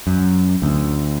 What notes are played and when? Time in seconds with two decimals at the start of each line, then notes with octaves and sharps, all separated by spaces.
0.07 F#2
0.62 D2